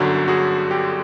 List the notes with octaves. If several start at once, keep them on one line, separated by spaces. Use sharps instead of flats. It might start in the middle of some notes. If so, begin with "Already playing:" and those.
Already playing: G1 F#2 D3 F#3 F#4
F#4 G#4
G4